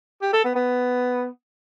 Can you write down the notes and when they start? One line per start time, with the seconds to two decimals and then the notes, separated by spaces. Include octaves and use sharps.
0.22 G4
0.33 A4
0.45 B3
0.56 B3